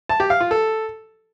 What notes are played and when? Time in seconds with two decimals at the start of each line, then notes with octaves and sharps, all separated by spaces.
0.09 A5
0.20 G4
0.30 F5
0.40 F4
0.51 A4